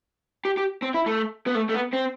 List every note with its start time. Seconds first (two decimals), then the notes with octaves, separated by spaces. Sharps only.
0.45 G4
0.57 G4
0.82 C4
0.94 E4
1.06 A3
1.47 B3
1.55 A3
1.69 A3
1.75 B3
1.93 C4